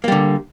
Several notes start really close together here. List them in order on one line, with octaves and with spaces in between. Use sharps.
A#3 G3 D3